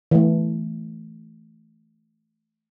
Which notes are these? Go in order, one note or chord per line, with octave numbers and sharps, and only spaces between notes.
E3 A3